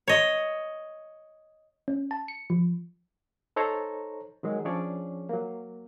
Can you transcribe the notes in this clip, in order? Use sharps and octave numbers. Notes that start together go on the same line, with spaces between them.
C#5 D#5
C#4
A5
C#7
F3
D#4 A4 C5 C#5 A#5
D#3 F#3 G#3
F3 C#4 D4 G#4 C#5 D5
F#3 A#3